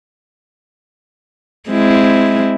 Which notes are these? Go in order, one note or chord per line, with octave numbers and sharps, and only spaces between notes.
G#3 C4 E4